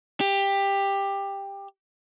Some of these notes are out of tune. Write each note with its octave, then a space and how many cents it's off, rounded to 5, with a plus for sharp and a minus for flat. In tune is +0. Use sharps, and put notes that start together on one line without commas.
G4 +15